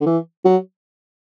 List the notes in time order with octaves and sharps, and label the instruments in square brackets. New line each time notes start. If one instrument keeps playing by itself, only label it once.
[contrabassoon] D3
E3
F#3